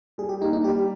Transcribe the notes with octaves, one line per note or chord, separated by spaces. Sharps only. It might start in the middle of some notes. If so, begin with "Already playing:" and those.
G3 G#4
G4
A#3 D#4
D#4
G3 G4